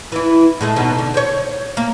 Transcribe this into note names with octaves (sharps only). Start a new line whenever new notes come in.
E3 E4
A2 G#3 A3
D#2 B2 D#4
D3
C5 C#5
A#3